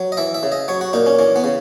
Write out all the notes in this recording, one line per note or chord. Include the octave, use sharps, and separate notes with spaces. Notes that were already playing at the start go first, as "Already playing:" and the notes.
Already playing: F#3
D#5
E3 E5
E5
C#3
D#5
F#3 C#5
F#4
A#2 D#4
C#4
E3 C#4
B3
C#3